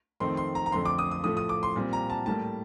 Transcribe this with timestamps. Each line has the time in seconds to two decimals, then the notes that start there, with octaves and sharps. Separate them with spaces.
0.20 F2 D#3 A3 C4 C6
0.37 C6
0.55 A#5
0.66 A#5
0.72 F2 D3 A3 C4 C6
0.85 D6
0.98 D#6
1.11 D#6
1.24 A2 F3 A3 D#6
1.37 D#6
1.49 D6
1.63 C6
1.76 A#2 G3 C4
1.93 A#5
2.10 A5
2.26 A2 G3 A#3 A5